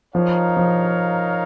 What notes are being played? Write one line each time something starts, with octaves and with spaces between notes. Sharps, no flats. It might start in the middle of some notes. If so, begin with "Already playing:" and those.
F3 D#4 A#4 C#5 F5
F3